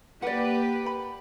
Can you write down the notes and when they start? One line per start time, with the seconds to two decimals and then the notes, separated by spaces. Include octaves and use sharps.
0.22 A#3 G4 B4 D5 F#5
0.86 B5